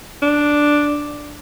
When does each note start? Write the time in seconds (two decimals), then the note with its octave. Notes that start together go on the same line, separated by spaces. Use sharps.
0.22 D4